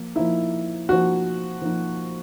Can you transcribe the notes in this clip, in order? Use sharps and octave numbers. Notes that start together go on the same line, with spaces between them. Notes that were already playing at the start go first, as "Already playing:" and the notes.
Already playing: F3 A#3
F3 A#3 D#4 E4
F3 A#3 D#4 F#4
F3 A#3 D#4